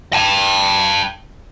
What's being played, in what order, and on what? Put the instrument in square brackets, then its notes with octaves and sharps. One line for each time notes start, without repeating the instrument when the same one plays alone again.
[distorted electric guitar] G5 A5